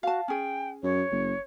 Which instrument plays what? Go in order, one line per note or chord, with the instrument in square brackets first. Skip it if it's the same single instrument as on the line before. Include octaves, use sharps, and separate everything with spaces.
[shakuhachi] F#4 [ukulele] F5 A5
[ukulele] C#4 G#4 [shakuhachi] G5
[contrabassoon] F#2 [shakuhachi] C#5
[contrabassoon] F#1